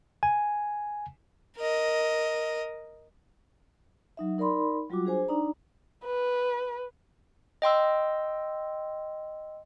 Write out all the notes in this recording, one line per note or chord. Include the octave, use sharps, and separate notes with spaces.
G#5
A#4 D#5
F#3 D#4 E5
D#4 A#4 D5 B5 C6
F#3 G3 F4 F#4 D6
D4 G#4 C5 G#5
D4 D#4 D5 A#5
B4
D#5 G5 C6 E6